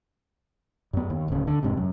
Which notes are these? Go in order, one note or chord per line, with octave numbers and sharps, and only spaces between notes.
F#2 B3
D#2
D1 C#3
D3
E1 G#2 C3
F#2